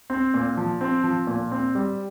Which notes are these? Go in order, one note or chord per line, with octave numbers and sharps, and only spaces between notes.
C4
A#2
F3
C4
F3
A#2
C4
G3